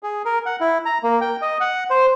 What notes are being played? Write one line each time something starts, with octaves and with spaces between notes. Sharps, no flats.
G#4
A#4
F#5
E4
A#5
A#3
G5
D#5
F#5
C5